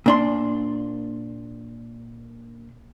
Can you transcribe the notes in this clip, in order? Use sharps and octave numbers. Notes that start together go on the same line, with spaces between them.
A#2 D4 C6